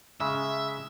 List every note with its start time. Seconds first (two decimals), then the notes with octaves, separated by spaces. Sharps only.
0.20 C#3 G#3 E5